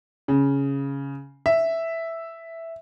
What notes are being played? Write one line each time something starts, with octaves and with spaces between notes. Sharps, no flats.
C#3
E5